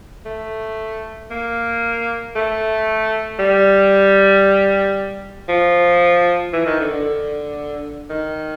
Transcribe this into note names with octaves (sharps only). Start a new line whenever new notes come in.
A3
A#3
A3
G3
F3
E3
D#3
D3
D3
D#3